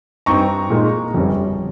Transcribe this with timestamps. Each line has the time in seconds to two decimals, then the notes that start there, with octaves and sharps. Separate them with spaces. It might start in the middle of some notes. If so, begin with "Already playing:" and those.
0.26 G2 G3 C4 D#4 A#5 C#6
0.70 A#2 G#3 D#4
1.14 G1 F2 C#3 G3 C#4